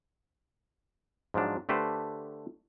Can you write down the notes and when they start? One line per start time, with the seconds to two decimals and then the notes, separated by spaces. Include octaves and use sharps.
1.34 G#2 F3 F#3 D4
1.69 D3 A3 G4 B4 C5